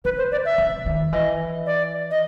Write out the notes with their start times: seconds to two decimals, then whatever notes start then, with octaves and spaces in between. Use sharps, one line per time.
0.05 C#3 B4
0.18 C5
0.32 D5
0.45 E5
0.58 C#3
0.86 D#3
1.13 E3 D#5
1.66 D5
2.11 D#5